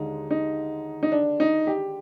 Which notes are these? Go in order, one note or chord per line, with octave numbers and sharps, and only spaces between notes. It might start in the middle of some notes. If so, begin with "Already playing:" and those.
Already playing: D#2 D3 G#3 D#4
D#4
D#4
D4
D#4
G4